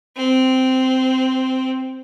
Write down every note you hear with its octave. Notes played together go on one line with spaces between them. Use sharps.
C4